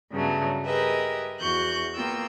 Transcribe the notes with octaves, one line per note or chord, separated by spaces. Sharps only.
G2 C#3 F#3 A3 B3
G4 G#4 A#4 B4 D#5 E5
E2 F#4 C#6 F#6 G6
A#3 B3 F4 G5 E6